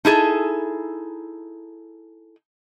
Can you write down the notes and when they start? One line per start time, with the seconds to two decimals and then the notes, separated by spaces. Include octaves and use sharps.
0.05 D#4 E4 G#4 A4